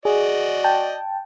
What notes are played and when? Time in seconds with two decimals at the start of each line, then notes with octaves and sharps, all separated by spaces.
0.05 F#4 G#4 D5 D#5
0.64 G5 A5